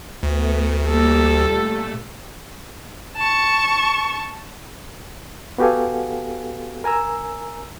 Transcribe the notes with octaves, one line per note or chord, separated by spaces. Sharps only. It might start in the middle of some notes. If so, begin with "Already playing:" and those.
D2 A3 B3
G3 A#3 A4 D6 A#6
A#2 A3
A5 C#6
B3 F#4 G4 A4 F5 G#5
A#4 G#5 A#5 E6